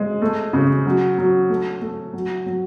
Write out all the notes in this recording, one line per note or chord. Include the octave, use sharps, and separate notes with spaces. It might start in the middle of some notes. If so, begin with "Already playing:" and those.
Already playing: G#3
A3
C#3
F#3
F#3
A3
A3
F#3
F#3